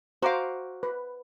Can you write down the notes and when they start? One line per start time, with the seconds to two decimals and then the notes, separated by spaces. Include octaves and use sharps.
0.22 F#4 C5 F5 A#5 D6
0.83 B4